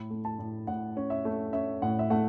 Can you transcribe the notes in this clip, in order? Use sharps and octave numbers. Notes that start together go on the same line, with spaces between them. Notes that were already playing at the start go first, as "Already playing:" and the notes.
Already playing: A2 B5
A3
A5
A2
A2 F#5
C#4
E5
A3
C#4 E5
A2 F#5
E5
A3 F#5